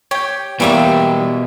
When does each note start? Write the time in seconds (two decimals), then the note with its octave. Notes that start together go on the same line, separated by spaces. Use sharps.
0.11 G4 C#5 G5
0.60 B2 E3 G3 A#3 E5 G5 C#6 E6